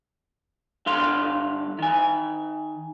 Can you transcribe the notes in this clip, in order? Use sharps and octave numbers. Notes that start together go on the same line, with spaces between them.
G2 D3 F5 C6
D#3 G#5